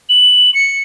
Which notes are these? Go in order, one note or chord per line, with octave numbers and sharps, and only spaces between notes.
F#7
C#7